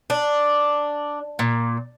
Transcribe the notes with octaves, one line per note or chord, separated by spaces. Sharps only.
D4
A#2